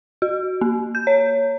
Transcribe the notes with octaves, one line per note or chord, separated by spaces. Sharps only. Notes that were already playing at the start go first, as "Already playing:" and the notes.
F#4
A#3
G6
C#5